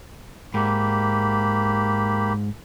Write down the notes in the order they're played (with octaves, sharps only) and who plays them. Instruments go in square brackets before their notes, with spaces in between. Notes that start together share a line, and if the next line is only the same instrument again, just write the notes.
[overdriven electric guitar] G#2 [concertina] A#3 G4 B5